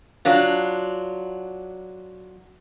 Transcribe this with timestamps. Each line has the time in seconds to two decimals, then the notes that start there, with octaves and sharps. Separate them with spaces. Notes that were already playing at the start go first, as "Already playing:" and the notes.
0.25 F#3 D4 F4